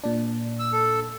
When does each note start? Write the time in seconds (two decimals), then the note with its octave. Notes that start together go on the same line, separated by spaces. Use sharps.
0.04 A#2 D4
0.59 E6
0.73 A4